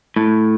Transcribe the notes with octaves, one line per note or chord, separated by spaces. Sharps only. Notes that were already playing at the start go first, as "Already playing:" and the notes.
A2